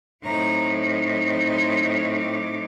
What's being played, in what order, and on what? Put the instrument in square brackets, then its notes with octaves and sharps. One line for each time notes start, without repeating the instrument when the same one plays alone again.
[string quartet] A2 F#3 C4 D#4 A#5
C6
D6